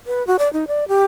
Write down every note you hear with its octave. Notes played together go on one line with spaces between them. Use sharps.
B4
F#4
D5
D#4
D5
G4